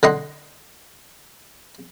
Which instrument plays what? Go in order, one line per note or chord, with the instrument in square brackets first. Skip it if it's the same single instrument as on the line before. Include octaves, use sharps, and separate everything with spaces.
[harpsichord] D3 D#5 F#5 C6